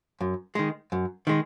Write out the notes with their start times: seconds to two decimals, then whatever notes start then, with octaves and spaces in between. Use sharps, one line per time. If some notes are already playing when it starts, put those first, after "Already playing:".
0.21 F#2
0.55 D#3 G#3
0.92 F#2
1.27 D#3 G#3